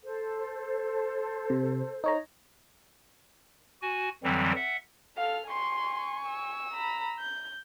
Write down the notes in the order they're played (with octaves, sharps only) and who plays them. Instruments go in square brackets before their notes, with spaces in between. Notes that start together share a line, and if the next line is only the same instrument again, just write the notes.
[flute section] A4 C5
[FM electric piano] C3
D#4 C#5 A#5
[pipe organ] F#4 G#5
F2 D3 E3 F#3 G3 C4
E5 F#5
[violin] A4 F6 [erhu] F5
[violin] G#5 C#6 [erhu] C6
[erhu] E6
[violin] A#5 B5
G6